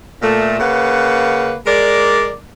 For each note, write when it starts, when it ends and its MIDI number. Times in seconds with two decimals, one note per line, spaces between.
0.22 0.59 46
0.22 0.59 57
0.59 1.53 49
0.59 1.53 58
0.59 1.53 71
0.59 1.53 78
1.66 2.32 56
1.66 2.32 70
1.66 2.32 74